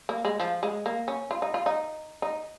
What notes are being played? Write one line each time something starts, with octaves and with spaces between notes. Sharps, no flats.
A#3
G#3
F3
G#3
A#3
C#4
F4
D#4
F4
D#4
D#4